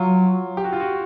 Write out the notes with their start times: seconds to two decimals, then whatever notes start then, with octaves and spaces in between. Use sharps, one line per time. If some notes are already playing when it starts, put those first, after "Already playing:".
Already playing: F#3 F4
0.57 G4
0.64 F#4
0.73 F4
0.80 F#4